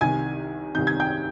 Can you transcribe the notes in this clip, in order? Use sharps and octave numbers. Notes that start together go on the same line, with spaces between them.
C2 C3 D#3 G#5 G#6
C2 C3 D#3 G6
G#6
G5 G6